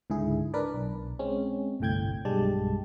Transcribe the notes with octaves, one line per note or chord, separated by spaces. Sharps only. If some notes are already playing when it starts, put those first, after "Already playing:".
C#2 G#2 D3 E4 G#4
D4 A#4 B4 D5
B1
G#3 C4 C#4
G1 C2 A2 G5 G6 G#6
B1 G2 G3 G#3 G4 A5